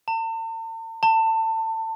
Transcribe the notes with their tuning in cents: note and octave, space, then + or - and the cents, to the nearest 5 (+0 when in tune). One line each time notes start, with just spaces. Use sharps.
A5 +45
A5 +25